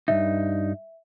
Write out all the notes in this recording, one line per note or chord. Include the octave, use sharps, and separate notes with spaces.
G2 C3 D#4 E5